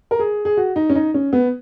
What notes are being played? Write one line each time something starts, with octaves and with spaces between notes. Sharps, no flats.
A#4
G#4
G#4
F#4
D#4
C#4
D#4
C#4
B3